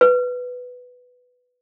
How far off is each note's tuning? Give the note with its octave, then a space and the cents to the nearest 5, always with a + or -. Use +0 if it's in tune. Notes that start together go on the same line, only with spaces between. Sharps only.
B4 +5